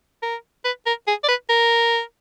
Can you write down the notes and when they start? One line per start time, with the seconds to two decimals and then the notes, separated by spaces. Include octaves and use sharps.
0.23 A#4
0.65 B4
0.86 A#4
1.07 G#4
1.24 D5
1.28 B4
1.50 A#4